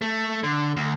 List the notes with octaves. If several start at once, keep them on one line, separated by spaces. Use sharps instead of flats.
A3
D3
D2